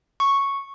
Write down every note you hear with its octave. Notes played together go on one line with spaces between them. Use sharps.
C#6